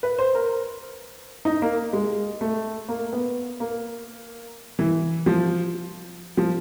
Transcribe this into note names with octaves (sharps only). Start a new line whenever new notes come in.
B4
C5
A#4
D#4
A#3
G#3
A3
A#3
B3
A#3
E3
F3
F3